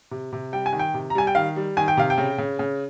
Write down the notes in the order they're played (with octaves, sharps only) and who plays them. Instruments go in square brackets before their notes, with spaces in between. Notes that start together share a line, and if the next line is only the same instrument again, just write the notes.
[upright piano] C3
C3
G3 G5
G#5
D#3
G5
C3
A#5
G3 G#5
G5
D#3 F5
G3
D#3 G#5
G5
C3 F5
G5
C#3
C#3
C#3